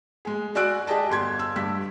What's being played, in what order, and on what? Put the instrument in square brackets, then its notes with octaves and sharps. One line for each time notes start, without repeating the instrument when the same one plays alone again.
[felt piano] G#3 G#4
F#4 D5 G#5 E6 F#6 D7
G4 G#4 D5 D#5 G#5 A5
G1 C6 G#6
E6
G2 E6 B6